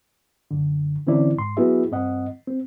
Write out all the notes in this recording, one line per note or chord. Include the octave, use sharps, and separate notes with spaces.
F#2 D3
D3 E3 C4 C#4 E4 D5
G#2 C6
F#3 B3 E4 F#4 G#4 E5
G2 C4 D#5 F#5
C4